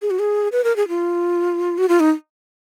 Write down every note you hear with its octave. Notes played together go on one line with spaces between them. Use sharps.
G#4
F#4
G#4
B4
A#4
G#4
F4
F#4
F4
D#4